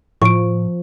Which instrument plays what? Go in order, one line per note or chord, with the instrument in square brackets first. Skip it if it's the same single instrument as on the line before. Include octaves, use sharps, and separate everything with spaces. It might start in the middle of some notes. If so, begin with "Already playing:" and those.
[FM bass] A2 [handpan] F3 [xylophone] C#6 D7